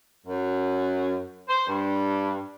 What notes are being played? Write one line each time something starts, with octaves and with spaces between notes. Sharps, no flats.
F#2
C5
G2